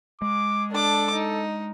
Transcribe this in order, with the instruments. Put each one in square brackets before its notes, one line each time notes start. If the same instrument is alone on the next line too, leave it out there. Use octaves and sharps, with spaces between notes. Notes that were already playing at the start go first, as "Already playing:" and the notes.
[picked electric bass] G#3 [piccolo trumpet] D6
[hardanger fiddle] D4 D6 [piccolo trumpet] A4
[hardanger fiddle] D#4